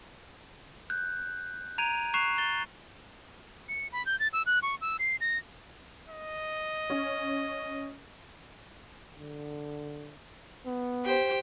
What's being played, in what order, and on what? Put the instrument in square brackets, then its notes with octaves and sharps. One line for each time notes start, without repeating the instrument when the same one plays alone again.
[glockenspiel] F#6 G6
A#5 G6 G#6 D7 D#7 F7
C#6 F#6 C7 E7 F7
A6 G7
[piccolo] C#7
B5
G6
A6
E6
F#6
C#6
E6
C7
A#6
[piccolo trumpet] D#5
[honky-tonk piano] C#4
[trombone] D3
B3
[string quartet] G4 C5 G5